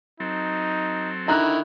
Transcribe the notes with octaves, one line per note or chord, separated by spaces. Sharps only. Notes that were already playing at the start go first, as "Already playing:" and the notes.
F#3 C4 D#4 A4
D3 D#3 E4 A#5 F#6